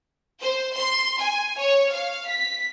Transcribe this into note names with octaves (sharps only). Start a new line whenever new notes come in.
C5
C6
G#5
C#5
F5
B6